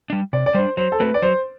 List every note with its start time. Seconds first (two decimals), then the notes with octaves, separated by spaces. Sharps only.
0.10 G3 D4
0.33 C3 D5
0.46 D5
0.54 G3 D4 C5
0.77 F#3 C5
0.92 A4
1.00 A3 C4 F#4 B4
1.14 D5
1.22 F#3 C5